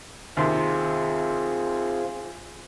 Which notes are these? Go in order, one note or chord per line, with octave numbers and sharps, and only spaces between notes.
D#2 C3 C4 F4 G#4